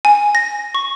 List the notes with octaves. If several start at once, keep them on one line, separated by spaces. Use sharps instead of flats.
G#5
A#6
C#6